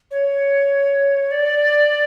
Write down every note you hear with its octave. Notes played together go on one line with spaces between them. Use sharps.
C#5
D5